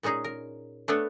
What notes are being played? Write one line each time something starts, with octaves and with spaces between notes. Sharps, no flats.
A#2 G#3 C#4 D#4 G#4
A#4
A3 B3 D4 A4 B4 C#5